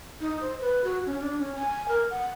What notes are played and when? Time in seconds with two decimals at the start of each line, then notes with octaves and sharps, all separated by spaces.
0.21 D#4
0.41 C5
0.60 B4
0.84 F#4
1.06 C#4
1.21 D4
1.39 C#4
1.55 G#5
1.88 A#4
2.10 F#5